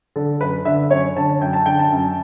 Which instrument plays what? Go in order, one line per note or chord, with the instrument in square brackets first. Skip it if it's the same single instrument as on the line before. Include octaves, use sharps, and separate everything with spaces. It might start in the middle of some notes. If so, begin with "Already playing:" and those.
[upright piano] D3 A4
F#2 B4
D3 E5
F#2 C#5
D3 A5
F#2 G5
A5
D3 G5
A5
F#2